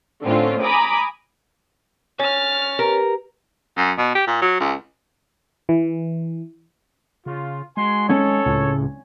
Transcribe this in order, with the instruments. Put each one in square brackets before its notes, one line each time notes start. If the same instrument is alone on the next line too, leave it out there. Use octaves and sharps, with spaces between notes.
[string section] A2 D3 C4 C#4 F4
G#5 A#5 B5 D6 D#6
[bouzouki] C#4 [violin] F6 A6
[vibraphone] G4 B4 [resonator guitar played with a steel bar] A#4
[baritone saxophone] F#2
B2
G4
A#2
F#3
C#2
[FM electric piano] E3
[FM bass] C#3 [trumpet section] F4
[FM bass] G#3 [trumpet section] F#4 G#5 C6
[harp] C#4 [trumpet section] A4 C#5
[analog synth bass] C#2 [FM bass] A2